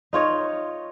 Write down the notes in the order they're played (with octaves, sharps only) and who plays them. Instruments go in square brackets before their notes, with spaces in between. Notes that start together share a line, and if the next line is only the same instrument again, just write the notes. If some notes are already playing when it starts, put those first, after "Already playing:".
[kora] D#4 F4 C#5 D#5